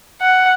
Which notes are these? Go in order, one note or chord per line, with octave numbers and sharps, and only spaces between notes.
F#5